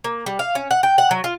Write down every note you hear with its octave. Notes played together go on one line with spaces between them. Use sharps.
A#3
G3
F5
C#4
F#5
G5
F#5
F#3
F4